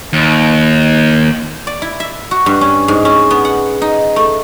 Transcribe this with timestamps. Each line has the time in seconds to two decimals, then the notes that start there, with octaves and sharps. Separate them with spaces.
0.13 D#2
1.67 D5
1.82 E4
2.00 E5
2.31 F#4
2.46 G2
2.61 C#4
2.88 G#2
3.05 C#4
3.31 B3
3.45 F#5
3.82 D#4
4.16 A3